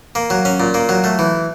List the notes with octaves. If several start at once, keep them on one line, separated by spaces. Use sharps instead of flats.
A#3
F#3
C#4
A#2
A#3
F#3
A3
E3